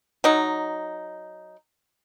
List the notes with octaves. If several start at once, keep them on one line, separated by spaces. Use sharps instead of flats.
F#3 D#4